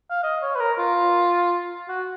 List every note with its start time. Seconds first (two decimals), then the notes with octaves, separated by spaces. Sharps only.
0.10 F5
0.23 D#5
0.42 C#5
0.55 B4
0.60 A#4
0.78 F4
1.88 F#4